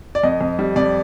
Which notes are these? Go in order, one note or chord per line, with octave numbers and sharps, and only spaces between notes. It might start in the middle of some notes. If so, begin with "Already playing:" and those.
D5
F2 D#5
F2
G3
F2 D5